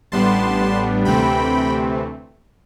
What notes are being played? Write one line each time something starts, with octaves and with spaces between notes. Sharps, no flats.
A1 A2 G3 B3 D4 A5 C6
D2 C3 E3 A3 C4 G5 B5